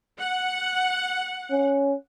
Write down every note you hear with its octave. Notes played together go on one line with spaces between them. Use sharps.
F#5
C#4